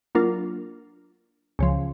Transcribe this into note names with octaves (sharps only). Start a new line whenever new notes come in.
F#3 A#3 D4 F4 A#4
C#2 C#3 F3